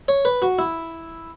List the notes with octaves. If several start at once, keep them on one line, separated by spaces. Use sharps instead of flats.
C#5
B4
F#4
E4